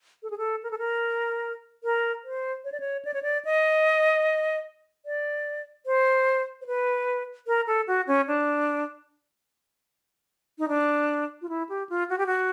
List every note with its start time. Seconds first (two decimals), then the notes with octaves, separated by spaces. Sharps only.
0.23 A4
0.30 G#4
0.38 A4
0.63 A#4
0.71 A4
0.79 A#4
1.84 A#4
2.24 C5
2.64 C#5
2.72 D5
2.80 C#5
3.05 D5
3.14 C#5
3.23 D5
3.45 D#5
5.06 D5
5.86 C5
6.61 C5
6.67 B4
7.47 A#4
7.67 A4
7.87 F#4
8.07 C#4
8.28 D4
10.59 D#4
10.68 D4
11.42 F4
11.49 E4
11.69 G4
11.89 F4
12.10 F#4
12.18 G4
12.27 F#4